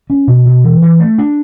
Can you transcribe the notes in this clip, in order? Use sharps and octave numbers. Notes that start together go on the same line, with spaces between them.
C#4
B2
B2
E3
E3
A3
D4